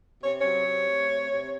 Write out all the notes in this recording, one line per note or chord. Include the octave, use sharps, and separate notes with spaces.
C3 C#5
C#5
F#3
C3
A3
C3
C3